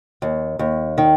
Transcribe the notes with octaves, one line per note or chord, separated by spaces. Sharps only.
D#2
D#2
D#3